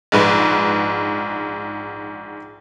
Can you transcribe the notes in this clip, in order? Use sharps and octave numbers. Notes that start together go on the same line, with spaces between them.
A#1 G#2 B4